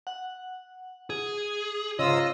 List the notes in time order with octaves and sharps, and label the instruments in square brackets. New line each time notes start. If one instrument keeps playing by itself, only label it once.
[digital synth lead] F#5
[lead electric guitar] G#4
[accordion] G#2 F4 E6 [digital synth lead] C#3 [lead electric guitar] D#5